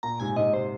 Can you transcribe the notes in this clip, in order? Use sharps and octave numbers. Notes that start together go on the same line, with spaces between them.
A#2 A#5
G#2 C3 G#5
G#2 C3 D#5
C3 C5